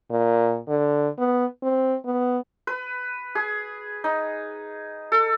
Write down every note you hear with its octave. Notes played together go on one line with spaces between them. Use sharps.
A#2
D3
B3
C4
B3
B4
G#4
D#4
A4